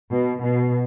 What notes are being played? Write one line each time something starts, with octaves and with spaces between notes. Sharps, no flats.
B2
B2